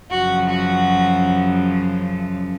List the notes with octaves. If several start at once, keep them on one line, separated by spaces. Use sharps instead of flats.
F#2 C#3 F3 F#4
F#4